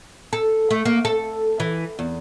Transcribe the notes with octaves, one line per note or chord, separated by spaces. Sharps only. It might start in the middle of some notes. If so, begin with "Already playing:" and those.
A4
A3
A#3
A4
E3
E2